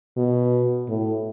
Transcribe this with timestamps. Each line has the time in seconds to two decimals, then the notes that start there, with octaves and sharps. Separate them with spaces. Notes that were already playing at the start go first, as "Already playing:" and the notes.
0.17 B2
0.88 A2